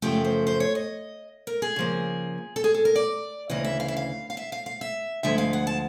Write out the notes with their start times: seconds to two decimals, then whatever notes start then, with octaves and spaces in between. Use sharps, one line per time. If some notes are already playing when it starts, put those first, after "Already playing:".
0.02 F#2 C#3 F3 A3 G4
0.24 C5
0.47 C5
0.60 C#5
0.75 D#5
1.47 A#4
1.62 G#4
1.76 C#3 F3 A#3
2.56 A4
2.64 G#4
2.74 A4
2.85 A#4
2.96 D5
3.50 D2 C#3 E3 D#5
3.65 E5
3.80 F5
3.88 E5
3.97 F5
4.30 F5
4.37 E5
4.52 F5
4.66 F5
4.81 E5
5.23 D2 D3 F3 G#3 E5
5.38 F5
5.53 F#5
5.67 A5